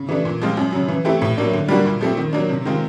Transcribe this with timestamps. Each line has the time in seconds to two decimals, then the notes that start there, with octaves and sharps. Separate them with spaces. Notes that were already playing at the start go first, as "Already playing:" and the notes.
Already playing: C#3
0.09 E3 A3 D4
0.25 A#2
0.41 F3 G#3 C4 F4
0.57 F#2
0.73 C#3 F#3
0.88 E3
1.05 A3 C4 E4 G4
1.22 A2
1.37 F#3 A#3 D4
1.53 D3
1.68 G3 A#3 D4 F#4
1.86 A#2
2.01 F3 A3 C4
2.17 D#3
2.33 F#3 A#3 D4
2.49 C3
2.65 D#3 G#3 C4 F4